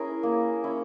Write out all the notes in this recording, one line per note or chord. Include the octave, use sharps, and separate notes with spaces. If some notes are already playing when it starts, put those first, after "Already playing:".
Already playing: C#4 E4 G#4 A#4
A#3
C#4 E4